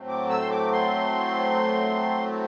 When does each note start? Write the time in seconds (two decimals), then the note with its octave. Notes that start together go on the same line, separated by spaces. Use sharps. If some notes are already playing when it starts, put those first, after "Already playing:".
Already playing: A2 F#3 A3 C4
0.08 D6
0.30 E6
0.41 C6
0.51 D6
0.72 C6